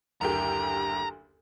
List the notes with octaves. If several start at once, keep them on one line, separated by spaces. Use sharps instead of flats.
F#1 D2 G4 A#5